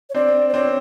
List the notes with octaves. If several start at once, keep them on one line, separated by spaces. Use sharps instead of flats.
C#5
C4 D4 D5
C5
C4 D4 C#5